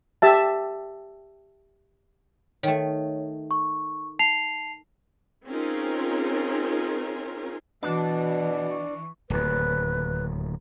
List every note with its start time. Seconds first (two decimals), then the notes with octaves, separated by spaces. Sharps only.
0.22 G4 E5 A5
2.63 D#3 A3 C#5
3.51 C#6
4.19 A5 C7 F7
5.47 C4 C#4 D#4 F4 G#4 A#4
7.83 B2 E3 D4 F#4
8.71 C#6
9.30 D1 D#2 B4